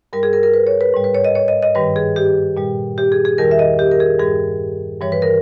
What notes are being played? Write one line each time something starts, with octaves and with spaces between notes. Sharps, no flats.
G2 G3 A#4
G#4
A#4
A#4
B4
C#5
B4
G#2 G3
B4
C#5
D#5
C#5
D#5
D#5
G2 D#3 G3 B4
G#4
G4
A#2 G3
G4
G#4
G#4
E2 D#3 G3 A#4
E5
D#5
G4
A#4
G#4
G2 G3 G#4
G2 E3 G3 C#5
B4
A#4